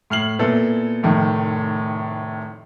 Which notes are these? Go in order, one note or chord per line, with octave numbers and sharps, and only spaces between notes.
A2 F6 C7 F#7
A#2 B3 E4 A4
F1 A2 D#3